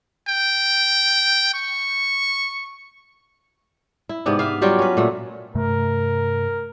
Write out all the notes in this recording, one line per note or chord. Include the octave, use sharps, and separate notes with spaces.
G5
C#6
E4
G#2 C3 B3 D4
B4 E5 F5
F#3 G3 F4 G4
C#4 B4
A#2 A3
G2 C3 A3 A#4